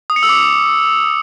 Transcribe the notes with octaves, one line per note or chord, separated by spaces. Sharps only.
D#6
C#7
E6
D6